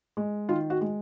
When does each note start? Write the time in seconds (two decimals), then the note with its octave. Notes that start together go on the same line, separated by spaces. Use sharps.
0.17 G#3
0.49 D#3 F4
0.70 F#4
0.81 G#3